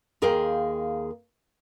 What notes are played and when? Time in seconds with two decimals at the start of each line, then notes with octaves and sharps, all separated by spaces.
0.22 D#2 G#4 A#4 C5 F5 G5